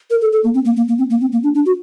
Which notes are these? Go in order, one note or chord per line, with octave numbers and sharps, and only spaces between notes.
A#4
A4
A4
A#3
C4
A#3
A#3
A#3
C4
A#3
C4
A#3
D4
D4
F#4